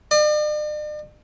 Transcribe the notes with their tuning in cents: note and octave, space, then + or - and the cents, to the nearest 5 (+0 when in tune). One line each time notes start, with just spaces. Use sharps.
D5 +45